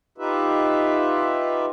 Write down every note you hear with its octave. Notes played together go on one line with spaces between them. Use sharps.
D#4 F4 G4 B4 E5